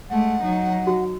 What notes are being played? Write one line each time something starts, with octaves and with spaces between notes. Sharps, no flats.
G#3 A3 F#5
F#3 D#4
F#4